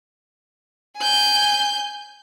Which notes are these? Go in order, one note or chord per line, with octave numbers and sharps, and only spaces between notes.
G#5 G6